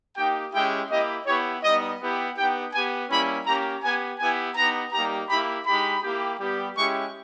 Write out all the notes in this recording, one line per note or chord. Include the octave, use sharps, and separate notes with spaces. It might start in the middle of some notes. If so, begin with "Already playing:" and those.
A#3 D#4 G4 G5
G#3 C#4 E4 G4 G5
A#3 E4 G4 D#5
B3 E4 G4 C#5
G3 B3 D#4 D#5
B3 E4 G4
B3 D#4 G4 G5
B3 G4 G#5
G3 A#3 C#4 E4 B5
A#3 C#4 G4 A#5
B3 G4 G#5
B3 E4 G4 G#5
B3 D#4 G4 A#5
G3 A#3 D#4 G4 A#5
A#3 E4 G4 B5
G#3 D#4 G4 B5
A#3 E4 G4
G3 B3 G4
G#3 C#4 E4 G4 C#6